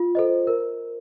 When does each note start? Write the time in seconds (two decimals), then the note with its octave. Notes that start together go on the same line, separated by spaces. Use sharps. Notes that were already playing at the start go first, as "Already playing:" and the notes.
Already playing: F4
0.15 A4 C5 D#5
0.47 A#4